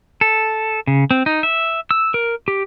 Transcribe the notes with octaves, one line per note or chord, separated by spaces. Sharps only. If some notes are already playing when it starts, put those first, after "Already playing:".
A4
C#3
C4
D#4
E5
E6
A#4
G4